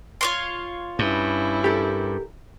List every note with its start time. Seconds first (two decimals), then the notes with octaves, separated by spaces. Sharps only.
0.21 F4 C#5 C6
0.99 G2 C#4 E4
1.64 G4 A4 A#4